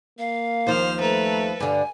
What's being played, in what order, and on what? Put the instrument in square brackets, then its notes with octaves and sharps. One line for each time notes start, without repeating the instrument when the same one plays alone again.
[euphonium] A#3 [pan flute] F5
[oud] D#2 F3 [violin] C5 F6
[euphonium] A3 [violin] A4 B4 [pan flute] A#5
[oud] G2 D3 [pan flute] G#5